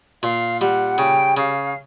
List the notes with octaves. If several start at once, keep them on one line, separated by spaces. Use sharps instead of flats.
A#2 F5
G3 F#5
C#3 G5
C#3 F5